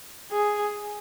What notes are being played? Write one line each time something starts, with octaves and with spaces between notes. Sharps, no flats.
G#4